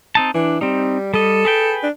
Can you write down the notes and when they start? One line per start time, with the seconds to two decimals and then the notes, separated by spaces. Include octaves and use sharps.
0.15 C4 D#4 A5
0.34 E3 D4
0.61 G3 C4 D#4
1.14 G3 A4 D#5
1.45 G#4 B4 G5
1.83 D4